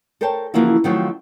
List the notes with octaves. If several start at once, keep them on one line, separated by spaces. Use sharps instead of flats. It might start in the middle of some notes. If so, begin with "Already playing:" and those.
A4 A#4 C5 C#5 G5 A5
C#3 E3 F3 A#3 E4 F#4
D#3 F3 F#3 A3 C4 F4